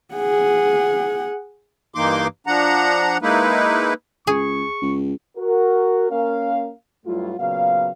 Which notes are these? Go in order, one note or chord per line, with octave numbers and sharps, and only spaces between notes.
G#4 F#5
G2 E3 A#3 D#4 C6 D6
F3 D4 F#5 A#5
G#3 A#3 D#4 E4 B4
C#2 G#4 C#6
C#2
F#4 A#4
A#3 C#4 A#4 F5
G2 F#3 G3 A3 E4 F4
A#2 C#3 F#3 B3 F#4 F5